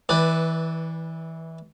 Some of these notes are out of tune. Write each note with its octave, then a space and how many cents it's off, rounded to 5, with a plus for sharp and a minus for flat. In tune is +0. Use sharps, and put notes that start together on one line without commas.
E3 -20 B4 +0 D5 +0